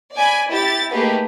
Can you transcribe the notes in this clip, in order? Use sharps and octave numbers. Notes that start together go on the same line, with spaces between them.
D5 G#5 B5
E4 G4 A6
A3 A#3 D#4 G4 G#4 B4